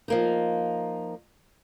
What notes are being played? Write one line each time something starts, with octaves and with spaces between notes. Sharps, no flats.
F3 A#3 D#4